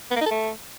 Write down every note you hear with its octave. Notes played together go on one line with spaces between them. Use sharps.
B3
A#3
D#4
A4
A3